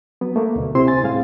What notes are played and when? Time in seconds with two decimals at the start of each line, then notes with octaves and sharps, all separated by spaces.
0.21 F#3 B3
0.36 A3 A#3
0.56 D2 B2
0.75 C3 C4 E4 C5 C6
0.87 G#5 A6
1.03 A2 G3 C4 G#4 F5